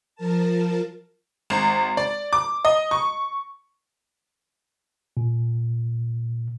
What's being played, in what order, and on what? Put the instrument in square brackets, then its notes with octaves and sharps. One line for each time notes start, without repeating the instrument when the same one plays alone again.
[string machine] F3 A#4 A5
[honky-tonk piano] G#1
D5
D6
D#5
C#6
[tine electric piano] A#2